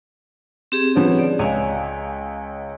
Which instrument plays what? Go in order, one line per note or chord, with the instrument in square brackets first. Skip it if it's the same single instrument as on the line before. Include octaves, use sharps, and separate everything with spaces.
[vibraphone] C4 G4 G#4
[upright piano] F3 B3 C#4
[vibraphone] D5
[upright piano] C#2 C#5 [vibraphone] D#5 F5 G#5